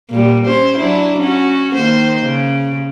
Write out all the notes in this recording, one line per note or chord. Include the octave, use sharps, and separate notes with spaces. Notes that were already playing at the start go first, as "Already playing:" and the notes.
A#2 G3
C#4 C5
F#3 D4 E4
C#4 F#4
D#3 A#3 C5
C#3